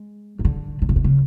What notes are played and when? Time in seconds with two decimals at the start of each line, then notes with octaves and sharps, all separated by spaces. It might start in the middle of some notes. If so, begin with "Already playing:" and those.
Already playing: G#3
0.39 D#3
0.45 D3
0.82 D3
0.89 C#3
0.96 C3
1.04 C#3